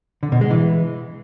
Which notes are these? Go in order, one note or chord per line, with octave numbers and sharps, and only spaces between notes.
D3
B2
G#3
E3